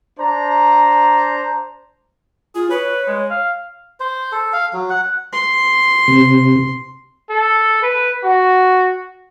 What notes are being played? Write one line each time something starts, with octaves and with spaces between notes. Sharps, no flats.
D4 C5 A#5
F4 G#4
B4 C#5
G#3
F5
C5
A4
F5
F#3
F#5
C6
C3
A4
B4
F#4